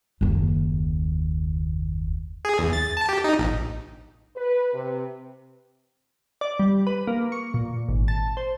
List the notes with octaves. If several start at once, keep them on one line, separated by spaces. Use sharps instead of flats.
F#1 D#2
G#4
E2
A6
A5
G4
D#4
A#1
B4
C3
D5
G3
B4
A#3
C#6
A#2
G#1
A5
C5